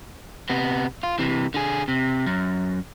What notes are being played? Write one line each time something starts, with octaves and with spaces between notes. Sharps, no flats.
C3 B3
F4
C3 E3
D3 G#4
C3
F#2